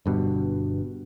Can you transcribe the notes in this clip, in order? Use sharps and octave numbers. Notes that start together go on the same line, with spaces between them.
G1 G2 B2